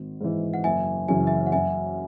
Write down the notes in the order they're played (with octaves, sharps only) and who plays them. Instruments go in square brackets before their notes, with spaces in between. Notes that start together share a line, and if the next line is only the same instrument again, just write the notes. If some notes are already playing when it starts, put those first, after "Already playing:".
Already playing: [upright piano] G#1
G#2 E3
[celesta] F#5
[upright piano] F#1 [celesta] E5 G#5
[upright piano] F#2 C#3 E3 [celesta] G#5
[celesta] E5 G#5
F#5
[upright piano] F#2 [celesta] E5 G#5